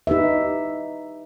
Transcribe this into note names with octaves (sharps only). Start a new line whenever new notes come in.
D#4 G4 B4 E5